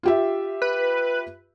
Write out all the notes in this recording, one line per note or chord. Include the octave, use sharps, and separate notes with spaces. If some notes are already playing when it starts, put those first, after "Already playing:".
F4 G4 E5
B4